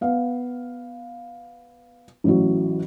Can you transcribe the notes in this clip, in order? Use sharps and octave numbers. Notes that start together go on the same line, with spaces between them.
B3 F5
A1 E3 F#3